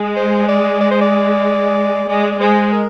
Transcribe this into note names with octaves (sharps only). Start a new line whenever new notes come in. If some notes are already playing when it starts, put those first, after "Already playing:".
Already playing: G#3
C5
D5
D5
C5
D5
G#3 D5
D5
G#3 C5
A#4